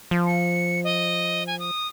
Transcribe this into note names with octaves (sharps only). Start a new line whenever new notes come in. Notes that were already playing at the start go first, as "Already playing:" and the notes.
F3
C#7
D#5
G#5
D#6